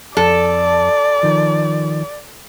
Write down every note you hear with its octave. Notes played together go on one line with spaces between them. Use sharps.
F2 A4 D5
D#3 F3